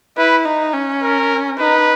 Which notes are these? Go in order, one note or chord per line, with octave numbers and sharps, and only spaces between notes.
E4 B4
D#4
C#4
A#4
D#4 B4